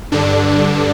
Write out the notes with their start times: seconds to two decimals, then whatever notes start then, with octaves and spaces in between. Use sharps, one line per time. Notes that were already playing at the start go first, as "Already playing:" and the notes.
0.12 G2 D3 D4